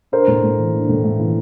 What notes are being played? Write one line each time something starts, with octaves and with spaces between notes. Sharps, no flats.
D4 A#4 C5
A2
A3
E3
D4
A2
A3
E3